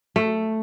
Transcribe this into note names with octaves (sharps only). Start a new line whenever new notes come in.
A3